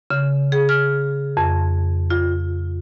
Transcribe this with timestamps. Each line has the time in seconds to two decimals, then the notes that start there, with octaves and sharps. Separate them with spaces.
0.11 C#3
0.52 G#4
0.69 F6
1.37 F2
2.10 F4